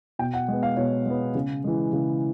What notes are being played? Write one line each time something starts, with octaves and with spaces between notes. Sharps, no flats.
B2 G5
F#5
G#3 B3
F5
B2 C#5
G#3 B3
C#3
E3 G#3
C#3